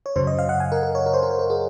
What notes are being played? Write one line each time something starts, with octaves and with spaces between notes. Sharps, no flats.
C#5
F#2 C#3 F#3 C5
D#5
F5
F#5
G#5
A#4
A#4
C#5
A#4
C5
A#4
C5
A#4
G#4